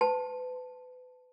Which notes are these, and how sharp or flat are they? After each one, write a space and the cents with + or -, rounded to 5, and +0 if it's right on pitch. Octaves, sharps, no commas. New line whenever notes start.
B4 +30 A5 +0